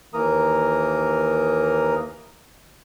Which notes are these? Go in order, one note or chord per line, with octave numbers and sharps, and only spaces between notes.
D#2 E3 A#3 A#4 A#5 D#6